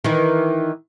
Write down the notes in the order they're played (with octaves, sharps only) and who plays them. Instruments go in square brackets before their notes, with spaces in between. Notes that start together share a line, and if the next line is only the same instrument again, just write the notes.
[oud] D#3 E3